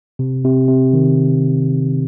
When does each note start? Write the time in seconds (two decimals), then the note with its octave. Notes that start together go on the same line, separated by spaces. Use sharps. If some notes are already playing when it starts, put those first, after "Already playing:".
0.19 C3
0.44 C3
0.68 C3
0.93 D#3